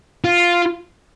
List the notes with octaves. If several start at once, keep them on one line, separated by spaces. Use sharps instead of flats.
F4